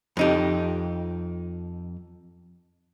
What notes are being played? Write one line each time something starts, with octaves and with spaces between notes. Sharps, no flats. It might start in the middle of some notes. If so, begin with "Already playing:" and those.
F2 D#4 G4